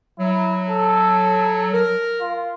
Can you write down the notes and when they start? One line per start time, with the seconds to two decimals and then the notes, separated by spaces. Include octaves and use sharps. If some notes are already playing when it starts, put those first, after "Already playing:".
0.19 F#3 E4
0.70 A4
1.73 A#4
2.21 F4